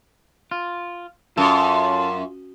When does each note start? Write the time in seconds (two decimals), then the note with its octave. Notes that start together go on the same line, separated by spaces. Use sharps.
0.51 F4
1.37 F#2 F4 A4